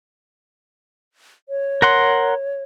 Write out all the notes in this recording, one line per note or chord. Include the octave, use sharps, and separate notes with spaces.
C#5
A#4 F#5 C6